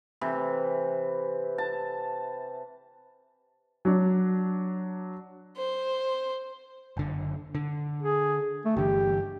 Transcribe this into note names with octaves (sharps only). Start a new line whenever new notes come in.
C3 E3
A5
F#3 D4
C5
F#1 D3
D3
G#4
A3
G1 D3 E3 G4